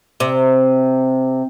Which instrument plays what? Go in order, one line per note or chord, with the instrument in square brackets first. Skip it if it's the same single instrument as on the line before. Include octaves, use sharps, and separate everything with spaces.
[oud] C3